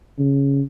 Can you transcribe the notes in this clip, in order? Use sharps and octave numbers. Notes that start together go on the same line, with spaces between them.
C#3